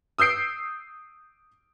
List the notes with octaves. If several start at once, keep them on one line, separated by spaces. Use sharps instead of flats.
D#6 E6 G6 C7 D7